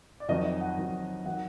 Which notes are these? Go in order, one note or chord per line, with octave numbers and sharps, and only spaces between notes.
D5
F2 D#3 F#3 D#5
D#5
F#5
F2 D#3 F#3
D#3 F#3 F#5